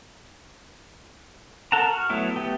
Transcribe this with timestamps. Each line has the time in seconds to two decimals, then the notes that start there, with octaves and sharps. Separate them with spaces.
1.72 A4 A#4 F#5 A5 A#5
1.87 F#4 F6
2.10 F#3 A3 B3 E4
2.36 A3 B3 G4